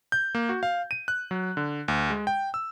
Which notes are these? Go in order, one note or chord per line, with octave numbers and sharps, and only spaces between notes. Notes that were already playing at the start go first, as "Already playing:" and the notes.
G6
A#3
F#4
F5
D#7
F#6
F#3
D3
D2
G#3
G5
E6